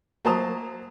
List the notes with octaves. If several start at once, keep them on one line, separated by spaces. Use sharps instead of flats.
F#3 A#3 C5 A5 A#5 D#6